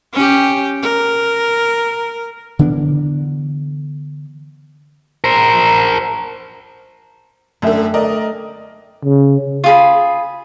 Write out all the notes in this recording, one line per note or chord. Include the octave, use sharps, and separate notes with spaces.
C#4 G4
A#4
D3 E3 B3 D4
A#4 C5
F#2 D3 A3 E5 G5
A#4 D5 D#5
C#3
F4 G#4 B5